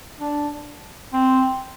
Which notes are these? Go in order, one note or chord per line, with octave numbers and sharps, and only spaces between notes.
D4
C4